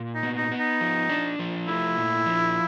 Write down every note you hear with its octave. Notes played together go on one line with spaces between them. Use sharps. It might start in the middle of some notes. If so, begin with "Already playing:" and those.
Already playing: A#2
D#4
B3
D#4
B3
D#4
F3
D4
F3
A3 E4
A#2
F3